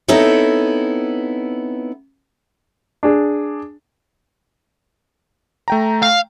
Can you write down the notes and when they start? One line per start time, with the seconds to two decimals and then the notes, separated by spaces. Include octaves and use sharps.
0.08 B3 C4 D#4 E4 A4 C#5
3.03 D4 G#4
5.68 A3 G5 A#5
6.03 F5